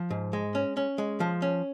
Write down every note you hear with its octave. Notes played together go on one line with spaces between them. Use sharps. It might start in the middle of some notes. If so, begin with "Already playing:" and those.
Already playing: F3
G#2
G#3
C#4
C#4
G#3
F3
C#4